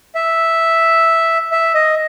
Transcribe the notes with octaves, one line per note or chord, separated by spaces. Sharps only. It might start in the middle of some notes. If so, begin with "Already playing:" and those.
E5
E5
D#5